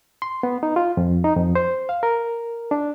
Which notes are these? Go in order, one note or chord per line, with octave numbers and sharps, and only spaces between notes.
C6
B3
D#4
F4
F2
D#4
F2
C5
F5
A#4
D4